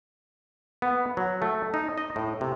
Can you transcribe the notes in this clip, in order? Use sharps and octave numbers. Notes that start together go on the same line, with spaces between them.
B3
F#3
A3
D#4
D#5
A2
C3